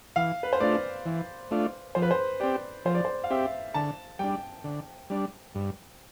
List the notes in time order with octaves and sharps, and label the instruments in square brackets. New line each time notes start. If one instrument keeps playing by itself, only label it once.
[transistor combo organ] E3 [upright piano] F5
[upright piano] B4
C5
[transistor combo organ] A3 D4 F4 [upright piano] D5
[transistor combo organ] E3
A3 D4 F4
[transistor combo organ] F3 [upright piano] C5
[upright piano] B4
C5
[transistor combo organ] C4 G4 [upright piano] D5
[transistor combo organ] F3 [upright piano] C5
[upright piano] D5
C5
F5
[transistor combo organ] C4 G4 [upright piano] E5
[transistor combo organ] D3 [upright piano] A5
[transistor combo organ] G3 D4 [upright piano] G5
[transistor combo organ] D3
G3 D4
G2